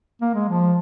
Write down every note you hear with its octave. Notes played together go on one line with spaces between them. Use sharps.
A#3
G#3
F3